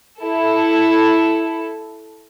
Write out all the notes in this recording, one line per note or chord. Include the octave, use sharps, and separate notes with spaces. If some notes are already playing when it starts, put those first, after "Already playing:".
E4 A4